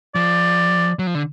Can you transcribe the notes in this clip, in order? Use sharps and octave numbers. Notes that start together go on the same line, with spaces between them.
F3 D5
F#3
F3
D3